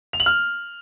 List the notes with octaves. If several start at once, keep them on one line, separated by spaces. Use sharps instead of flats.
F7
F#7
F6